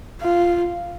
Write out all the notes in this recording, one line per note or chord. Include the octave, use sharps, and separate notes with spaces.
F4